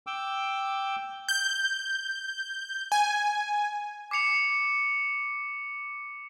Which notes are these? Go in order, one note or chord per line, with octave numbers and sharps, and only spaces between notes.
G5 D6 E6
G6
G#5
D6 C7 C#7 F7